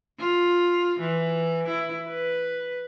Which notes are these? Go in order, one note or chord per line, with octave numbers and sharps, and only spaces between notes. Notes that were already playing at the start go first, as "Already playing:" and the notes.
F4
E3
E4
B4